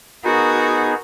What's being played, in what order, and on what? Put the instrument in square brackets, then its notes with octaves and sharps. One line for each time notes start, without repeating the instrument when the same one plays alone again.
[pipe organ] B3 D#4 G#4 [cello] F#4 A#4